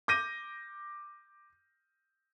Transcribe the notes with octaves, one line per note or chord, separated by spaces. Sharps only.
D6 G6 A#6 D#7